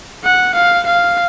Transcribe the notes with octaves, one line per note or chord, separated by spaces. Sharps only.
F#5
F5
F5